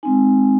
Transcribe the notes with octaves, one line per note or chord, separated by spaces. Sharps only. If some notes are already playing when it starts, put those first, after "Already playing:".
G#3 C4 D#4 G#5